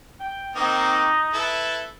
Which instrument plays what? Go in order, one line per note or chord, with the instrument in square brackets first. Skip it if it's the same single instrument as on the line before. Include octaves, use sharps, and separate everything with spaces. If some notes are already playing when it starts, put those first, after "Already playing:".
[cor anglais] G5
[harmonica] D#3 A#3 C4 [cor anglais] D#4
[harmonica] E4 A4 B4